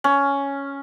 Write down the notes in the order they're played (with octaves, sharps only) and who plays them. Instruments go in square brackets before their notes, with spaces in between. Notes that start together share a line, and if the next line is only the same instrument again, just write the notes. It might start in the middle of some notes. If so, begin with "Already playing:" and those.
[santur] C#4